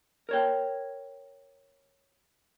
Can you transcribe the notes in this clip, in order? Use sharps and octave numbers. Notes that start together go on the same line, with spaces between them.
A#4 C#5 G5